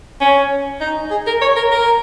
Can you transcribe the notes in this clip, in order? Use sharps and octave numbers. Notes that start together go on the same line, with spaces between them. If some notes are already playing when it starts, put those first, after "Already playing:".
C#4
D#4
G#4
A#4
C#5
A#4
A#4